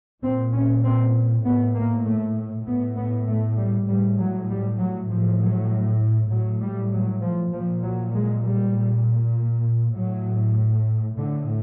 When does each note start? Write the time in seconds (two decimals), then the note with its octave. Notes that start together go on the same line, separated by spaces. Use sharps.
0.22 A#2 C4
0.53 C#4
0.84 C4
1.45 A2 B3
1.75 A#3
2.05 A3
2.66 A2 B3
2.97 B3
3.28 A3
3.58 G3
3.88 A2 G3
4.19 F#3
4.49 G3
4.79 F#3
5.10 A2 F3
5.40 F#3
6.31 A2 F#3
6.62 G3
6.92 F#3
7.22 F3
7.53 A#2 F3
7.83 F#3
8.15 G#3
8.44 G3
8.75 A#2
9.96 A2 F#3
11.18 A2 D3